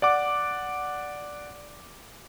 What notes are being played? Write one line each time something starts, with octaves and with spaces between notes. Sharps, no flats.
D5 F#5 D6